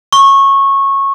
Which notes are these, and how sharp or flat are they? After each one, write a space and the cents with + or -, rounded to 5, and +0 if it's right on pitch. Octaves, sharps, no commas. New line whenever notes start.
C#6 -15